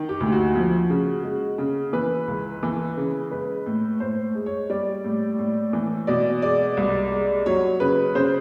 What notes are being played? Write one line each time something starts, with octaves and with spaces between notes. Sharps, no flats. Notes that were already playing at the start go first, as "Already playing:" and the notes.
Already playing: D#3
G4
D2
F#4
F3
C#3
G#3
C#3
E3 B4
C#2
E3
C#3
G#3 B4
A2
A2 C5
G#3
C#5
G3 D5
A2
A2
E3
B2 D5
G#3 D5
C2
G#3
F#3 C#5
C#3 B4
C#3 C5